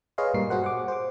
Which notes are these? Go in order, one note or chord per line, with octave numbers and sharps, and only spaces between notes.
G#4 B4 C#5 D#5 F5 C6
G2 A#2 G3 A#4 C7
F#4 G#4 C5 F#5
F#5 D6
C5 D6